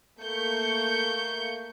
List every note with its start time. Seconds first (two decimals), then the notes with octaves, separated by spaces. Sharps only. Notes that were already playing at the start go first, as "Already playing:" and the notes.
0.21 A3 A#3 C#6 G6 C#7